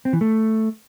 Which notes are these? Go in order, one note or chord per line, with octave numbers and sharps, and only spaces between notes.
C4
E3
A3